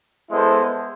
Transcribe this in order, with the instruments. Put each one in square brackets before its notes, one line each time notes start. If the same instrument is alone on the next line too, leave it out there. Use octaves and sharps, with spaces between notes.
[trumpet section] G#3 B3 E4 A4 C5